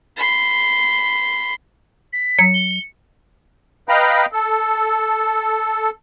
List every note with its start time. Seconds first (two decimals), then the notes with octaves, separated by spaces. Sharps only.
0.17 B5 C6
2.13 B6
2.39 F#3 C#7
2.54 G7
3.89 B4 D#5 F5 G5 A#5 B5
4.33 A4